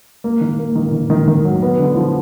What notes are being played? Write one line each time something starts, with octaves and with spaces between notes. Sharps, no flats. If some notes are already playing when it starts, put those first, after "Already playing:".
A#3
D#3
A#3
D#3
D#3
D#3
D#3
F#3
B3
D3
F3